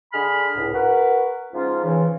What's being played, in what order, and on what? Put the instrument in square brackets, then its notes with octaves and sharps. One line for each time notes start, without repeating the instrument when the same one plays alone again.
[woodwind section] D3 G#4 B5 F6
C#2 A2
F#4 A#4 B4
G#2 F3 C#4 F4
C#3 E3